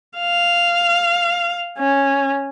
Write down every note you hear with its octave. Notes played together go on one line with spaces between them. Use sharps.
F5
C#4